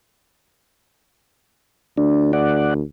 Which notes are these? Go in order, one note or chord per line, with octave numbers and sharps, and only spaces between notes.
D2 D4
D5 F#5